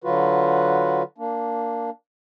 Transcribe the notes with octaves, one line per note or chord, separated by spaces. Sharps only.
D3 F#3 F4 F#4 B4
A#3 D4